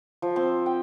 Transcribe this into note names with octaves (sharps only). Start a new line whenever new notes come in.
F3
C4
G5